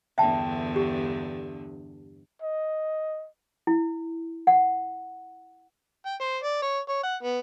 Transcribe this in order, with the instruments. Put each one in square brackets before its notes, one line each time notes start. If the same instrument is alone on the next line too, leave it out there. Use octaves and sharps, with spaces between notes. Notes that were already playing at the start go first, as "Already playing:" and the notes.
[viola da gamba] E2 G2 D3 [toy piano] E5 G5 A5
[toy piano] G4
[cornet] D#5
[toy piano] E4
F#5
[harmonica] G5
C5
D5
C#5
C#5
F#5
B3